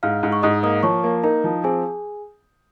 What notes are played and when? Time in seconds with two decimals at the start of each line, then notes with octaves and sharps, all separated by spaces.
0.03 G#2 F5 F6
0.23 G#2
0.32 C#6
0.42 G#2 D#5 D#6
0.63 A#3 D#5 D#6
0.83 F3 C#5 C#6
1.04 A#3
1.24 D#4 A#4 A#5
1.44 F3
1.64 C4 G#4 G#5